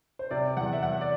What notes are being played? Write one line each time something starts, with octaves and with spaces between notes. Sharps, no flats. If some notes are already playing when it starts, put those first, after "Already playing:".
C5
C3 D5
E2 F#5
E5
E2 F#5
D5